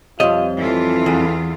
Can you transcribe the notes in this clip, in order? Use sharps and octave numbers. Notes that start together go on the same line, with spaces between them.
F2 G3 F4 C#5 D#5
E3 F4 A4
E2